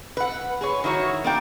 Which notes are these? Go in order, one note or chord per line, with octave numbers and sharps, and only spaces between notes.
B4 F#5
G#4 B4 C#5
D#3 E4 F#4 C#5
A#3 D4 G5